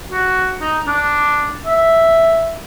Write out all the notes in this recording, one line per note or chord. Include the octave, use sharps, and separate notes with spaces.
F#4
D#4
D4
E5